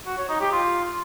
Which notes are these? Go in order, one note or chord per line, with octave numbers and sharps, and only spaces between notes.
F#4
C#5
D#4
G4
F4